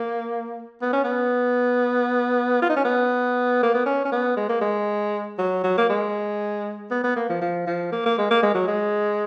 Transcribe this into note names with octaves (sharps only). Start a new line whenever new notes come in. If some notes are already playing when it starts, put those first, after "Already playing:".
Already playing: A#3
B3
C#4
B3
F4
D#4
C#4
B3
A#3
B3
C#4
C#4
B3
G#3
A#3
G#3
F#3
F#3
A#3
G#3
B3
B3
A#3
F3
F3
F3
A#3
A#3
G#3
A#3
G#3
F#3
G#3